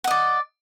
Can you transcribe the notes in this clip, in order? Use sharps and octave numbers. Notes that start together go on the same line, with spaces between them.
D5 D#5 F#5